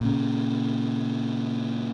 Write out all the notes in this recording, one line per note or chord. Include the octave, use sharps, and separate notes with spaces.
A#2 C#3